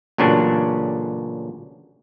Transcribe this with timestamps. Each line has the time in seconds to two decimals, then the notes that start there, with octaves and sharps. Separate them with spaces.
0.18 A1 A#2 C#3 F#3 D4